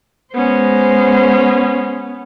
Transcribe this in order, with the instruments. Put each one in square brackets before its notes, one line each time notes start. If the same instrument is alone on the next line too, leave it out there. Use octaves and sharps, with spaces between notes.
[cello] G#3 C5 [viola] B3 C#4